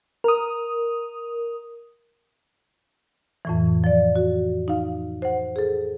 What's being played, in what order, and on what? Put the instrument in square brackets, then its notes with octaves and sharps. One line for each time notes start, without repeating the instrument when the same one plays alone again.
[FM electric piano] A#4 D#6
[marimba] F2 A2 E3
F3 D5
F#4
D#4 F5
C5 F#5
G#4 A4